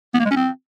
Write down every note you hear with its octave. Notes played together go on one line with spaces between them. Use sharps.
B3
A#3
G#3
C#4
C4